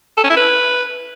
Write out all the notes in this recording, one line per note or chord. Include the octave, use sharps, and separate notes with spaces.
A4
C#4
E4
B4